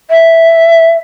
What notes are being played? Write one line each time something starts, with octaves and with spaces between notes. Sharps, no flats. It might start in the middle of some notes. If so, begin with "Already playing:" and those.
E5